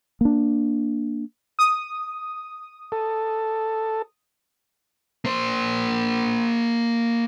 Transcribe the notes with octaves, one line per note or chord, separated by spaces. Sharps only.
A#3 D4
D#6
A4
A#3 C5